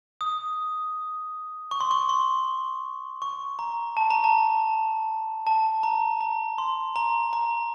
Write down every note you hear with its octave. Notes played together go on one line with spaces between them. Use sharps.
D#6
C#6
C6
C#6
C6
C#6
A#5
A5
A#5
A5
A5
A#5
A#5
C6
A#5
A#5